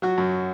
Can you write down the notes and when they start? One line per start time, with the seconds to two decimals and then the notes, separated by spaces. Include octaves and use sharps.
0.02 F#3 F#4
0.18 F#2